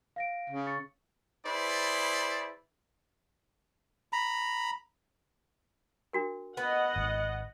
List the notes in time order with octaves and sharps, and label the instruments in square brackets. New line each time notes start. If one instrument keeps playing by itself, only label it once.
[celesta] F5 A#6 D7
[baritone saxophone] C#3
[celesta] C#6 A6 C#7
[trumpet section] E4 G#4 B4 C5 D5
[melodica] A#5 B5
[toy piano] D4 F#4 A#4
[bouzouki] B3 B4 [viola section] D#5 F#5
[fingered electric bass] G#1 G#2